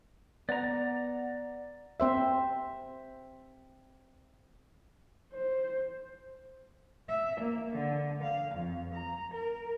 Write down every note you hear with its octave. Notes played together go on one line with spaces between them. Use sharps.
B3 D5 F#5 A#5
C4 C5 E5
C5
E5
A#3
D3
F5
F2
A#5
A#4